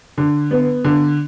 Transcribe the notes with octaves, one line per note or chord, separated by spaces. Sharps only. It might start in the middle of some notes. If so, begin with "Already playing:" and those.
D3
B3
D3